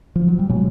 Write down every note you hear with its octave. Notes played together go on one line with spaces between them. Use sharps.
F3
F#3
G3
B2 F#3 G#3